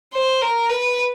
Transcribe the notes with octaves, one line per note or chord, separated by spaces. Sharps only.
C5
A#4
B4